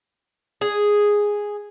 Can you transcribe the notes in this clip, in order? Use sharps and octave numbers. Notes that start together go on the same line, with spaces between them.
G#4